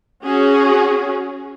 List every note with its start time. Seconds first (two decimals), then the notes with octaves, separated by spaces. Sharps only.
0.24 C#4 F#4 G#4